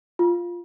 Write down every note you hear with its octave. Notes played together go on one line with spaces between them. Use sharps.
F4